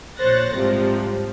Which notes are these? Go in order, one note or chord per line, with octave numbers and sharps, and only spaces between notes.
A#1 C5 C#5 F#6 A6 A#6
G#2 C3 F3 G3